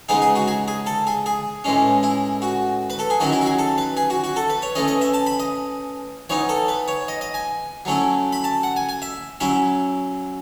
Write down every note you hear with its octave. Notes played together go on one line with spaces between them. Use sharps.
C#3 G#3 B3 D#4 G#4
G#4
F#4
G#4
G#4
A4
G#4
G#4
A2 E3 G#3 C#4
E4
F#4
B4
A4
G#4
D#3 F#3 C#4 E4 F#4
E4
F#4
G#4
A4
B4
G#4
F#4
F#4
A4
B4
C#5
E3 A3 C#4 D#5
D#5
E5
A5
B5
D#5
E3 B3 D#4 C#5
A4
B4
C#5
D#5
D#5
G#5
F#3 A3 C#4 E4
B5
A5
F#5
G#5
G#5
E5
F#3 C#4 E4 E5